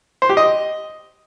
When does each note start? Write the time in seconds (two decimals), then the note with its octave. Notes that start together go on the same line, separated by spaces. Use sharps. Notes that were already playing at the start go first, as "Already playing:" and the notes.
0.22 C5
0.29 G4
0.37 D#5